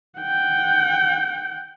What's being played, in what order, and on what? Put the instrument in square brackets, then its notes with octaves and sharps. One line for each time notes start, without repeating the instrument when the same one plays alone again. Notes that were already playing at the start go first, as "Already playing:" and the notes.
[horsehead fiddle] F#5 G5